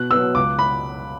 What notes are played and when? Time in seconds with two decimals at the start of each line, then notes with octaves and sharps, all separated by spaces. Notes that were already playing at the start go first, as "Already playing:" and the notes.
Already playing: B2 F#6
0.11 F#3 B3 E6
0.35 C#2 D6
0.59 B5